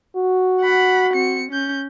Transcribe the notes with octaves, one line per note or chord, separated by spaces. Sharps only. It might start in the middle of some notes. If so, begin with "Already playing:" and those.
F#4
F#5 B5
C4 C#7
C#4 G6